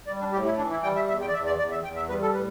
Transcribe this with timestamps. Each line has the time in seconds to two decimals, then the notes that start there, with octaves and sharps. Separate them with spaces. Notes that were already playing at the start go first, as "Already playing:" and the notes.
0.07 G3 D5
0.20 D4
0.32 A2 G4
0.45 E4
0.58 E3 D4
0.71 E4
0.83 G3 G5
0.96 E5
1.08 E2 E5
1.21 G5
1.28 D5
1.34 E2 E5
1.46 D5
1.59 E2 D5
1.72 E5
1.84 E2 G5
1.96 E5
2.09 G3 B4
2.22 A4
2.34 A2 B4